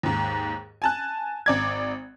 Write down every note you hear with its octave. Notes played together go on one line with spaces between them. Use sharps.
D#2 G#2
G#5 A5 F#6
G#1 D5 G#6